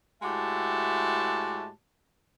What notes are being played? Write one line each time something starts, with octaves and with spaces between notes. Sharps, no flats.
A2 G#3 F#4 G4 E5 A5